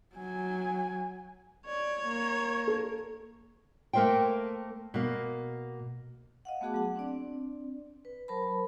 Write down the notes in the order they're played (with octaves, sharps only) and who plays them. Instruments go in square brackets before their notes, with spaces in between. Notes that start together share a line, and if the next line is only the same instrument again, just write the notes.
[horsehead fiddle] F#3 G#5
[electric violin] C#5 [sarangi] D5
[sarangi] A#3
[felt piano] A4
[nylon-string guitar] A3 A#3 A#4 C5 E5 G5
B2 A#3
[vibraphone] D#5 F5 F#5
A3 B3 F#4 G#4 A5 D6
F#3 F#5
C4 D4 D5
B4
F#3 A#4 C5 A5 B5